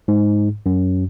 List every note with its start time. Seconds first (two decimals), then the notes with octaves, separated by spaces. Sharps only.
0.08 G#2
0.66 F#2